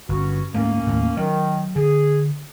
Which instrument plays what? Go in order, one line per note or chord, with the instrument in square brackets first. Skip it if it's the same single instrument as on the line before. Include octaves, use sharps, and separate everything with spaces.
[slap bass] G1 [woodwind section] B3 C#4 F#4
[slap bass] D2 G#2 A3 [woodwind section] A#3 C#4
[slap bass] D#2 A2
[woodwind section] D#3 [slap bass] F#3
[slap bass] D3 [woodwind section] G#4